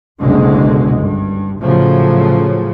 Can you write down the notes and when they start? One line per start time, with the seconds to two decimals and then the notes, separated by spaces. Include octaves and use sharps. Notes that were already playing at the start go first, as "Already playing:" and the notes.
0.21 F#1 C2 B2 D3 G#3
0.99 G2
1.61 A2 C#3 F3 F#3